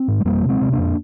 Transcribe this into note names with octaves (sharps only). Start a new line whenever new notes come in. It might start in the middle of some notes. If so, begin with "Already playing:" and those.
Already playing: C4
G#2
G#3
F2 G3 A#3
C3
G#3 C4
C3
A#3 D4
F2